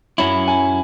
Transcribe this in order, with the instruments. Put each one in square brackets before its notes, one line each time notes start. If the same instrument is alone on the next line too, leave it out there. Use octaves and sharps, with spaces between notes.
[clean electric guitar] F#2 F#3 C#4 E4 [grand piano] B5
[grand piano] G#5